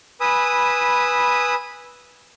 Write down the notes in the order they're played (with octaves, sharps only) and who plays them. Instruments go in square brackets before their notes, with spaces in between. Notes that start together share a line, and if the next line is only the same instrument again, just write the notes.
[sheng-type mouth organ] B4 G#5 B5 D#6 E6